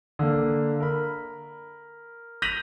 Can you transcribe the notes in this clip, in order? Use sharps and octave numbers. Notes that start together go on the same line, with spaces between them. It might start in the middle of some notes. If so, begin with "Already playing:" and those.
D3 A#3
A#4 B5
G6 A#6 B6 D#7 F7 F#7